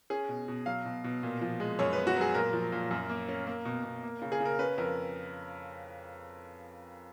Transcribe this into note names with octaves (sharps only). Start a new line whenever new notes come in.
C#4 G#4
B2
B2
F#3 F5
B2
B2
A#2
F3
G#3
F#2 C#5
B3 B4
F#4
F#3 G#4
A#2 A#4
F3
A#2
F#2
A#3
C#4
A#3
B2
B2
A#3
C#3
G#4
C#3
A#4
C#4 B4
F2 A#4